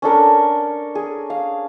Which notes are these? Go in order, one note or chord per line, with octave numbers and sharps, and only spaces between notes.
C#4 D4 A4 A#4
G#4
F5